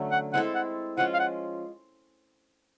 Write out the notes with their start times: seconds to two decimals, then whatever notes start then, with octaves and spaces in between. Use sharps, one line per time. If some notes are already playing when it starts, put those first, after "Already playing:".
Already playing: D3 F#3 A3 C#4
0.12 F#5
0.33 G#3 C4 E4 A4 F#5
0.55 F#5
0.97 F3 G#3 C#4 F4 F#5
1.14 F5
1.20 F#5